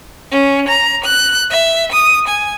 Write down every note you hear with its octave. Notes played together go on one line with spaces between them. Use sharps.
C#4
A#5
F#6
E5
D#6
G#5